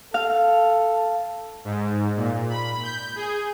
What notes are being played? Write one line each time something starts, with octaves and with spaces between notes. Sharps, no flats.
A4 F5
G#2
A#2
B5
G6
G#4